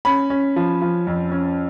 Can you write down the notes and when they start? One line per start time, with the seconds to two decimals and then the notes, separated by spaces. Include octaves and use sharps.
0.05 C#4 B5
0.30 C#4
0.56 F3
0.82 F3
1.07 F2
1.31 C#4